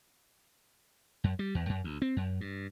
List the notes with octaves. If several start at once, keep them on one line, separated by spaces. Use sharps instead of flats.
F#2
G3
E2
F#2
D2
C4
F#2
G2